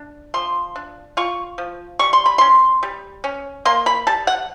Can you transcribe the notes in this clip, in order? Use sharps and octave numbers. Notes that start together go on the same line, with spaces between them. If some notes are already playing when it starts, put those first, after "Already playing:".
Already playing: D4
F3 C6
D4
F4 C#6
F3
G3 C#6
C6
B5
C#4 C6
G3
C#4
A#3 C6
B5
G3 A5
F#5